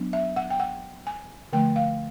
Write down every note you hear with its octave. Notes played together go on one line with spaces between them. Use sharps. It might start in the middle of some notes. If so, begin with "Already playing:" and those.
Already playing: F#3 B3 D4
E5
F#5
G5
F#5
G#5
D3 F3 A3 G5
F5